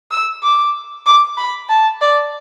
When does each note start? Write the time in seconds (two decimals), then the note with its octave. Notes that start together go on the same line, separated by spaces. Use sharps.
0.11 E6
0.43 D6
1.06 D6
1.38 B5
1.69 A5
2.01 D5